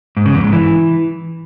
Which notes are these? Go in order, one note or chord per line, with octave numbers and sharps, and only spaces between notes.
G#2
C#3
E2
G#2
E3